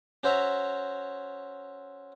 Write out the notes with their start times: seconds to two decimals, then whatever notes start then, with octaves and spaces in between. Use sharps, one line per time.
0.23 C#4 F#4 C5 C#5 E5 A#5